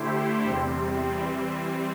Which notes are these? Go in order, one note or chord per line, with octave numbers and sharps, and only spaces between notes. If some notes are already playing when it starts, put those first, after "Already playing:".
Already playing: D3 A3 E4 G4 C5
E2 C3 G3 C4
E3 G3 C4